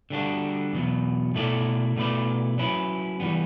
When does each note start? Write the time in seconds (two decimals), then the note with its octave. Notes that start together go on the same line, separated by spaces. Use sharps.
0.10 D3 G3 D4 F#4
0.73 E2 B2 F#3
1.34 B2 A3 E4 A4 D5
1.96 B2 A3 E4 B4 D5
2.58 F#3 C#4 E4 B4
3.20 E3 G3 B3